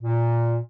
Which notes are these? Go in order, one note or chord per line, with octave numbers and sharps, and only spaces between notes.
A#2